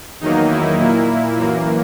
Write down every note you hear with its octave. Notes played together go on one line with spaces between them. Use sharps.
E2 D#3 F#3 A#3 D#4
E4
A#2 A#3
F#2 E3 A#3